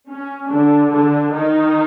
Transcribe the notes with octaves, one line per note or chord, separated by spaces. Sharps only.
C#4
D3 D4
D3 D4
D#3 D#4